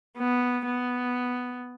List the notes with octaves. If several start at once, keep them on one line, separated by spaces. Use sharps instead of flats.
B3
B3